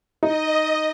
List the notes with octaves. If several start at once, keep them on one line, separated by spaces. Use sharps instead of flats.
D#4 D#5